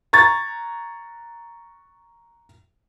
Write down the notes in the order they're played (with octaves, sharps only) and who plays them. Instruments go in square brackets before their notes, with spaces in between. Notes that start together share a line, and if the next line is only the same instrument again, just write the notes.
[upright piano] A#5 C#6 G#6 A6